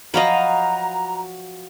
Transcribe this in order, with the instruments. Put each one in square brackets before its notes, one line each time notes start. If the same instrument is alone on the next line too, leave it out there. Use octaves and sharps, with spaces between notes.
[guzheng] F3 F#3 F#4 [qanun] D#5 F5 B5 [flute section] A#5